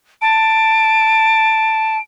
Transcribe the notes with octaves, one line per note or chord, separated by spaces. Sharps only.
A5 D7